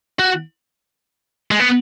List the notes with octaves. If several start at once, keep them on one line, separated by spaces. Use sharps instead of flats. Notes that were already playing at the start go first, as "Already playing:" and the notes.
F#4
G#3
B3